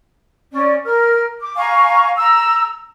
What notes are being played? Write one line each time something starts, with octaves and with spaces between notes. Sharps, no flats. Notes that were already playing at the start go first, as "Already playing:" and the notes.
C#4 D5
A#4 F6
D6
F5 G#5 A#5 C#6
A#5 E6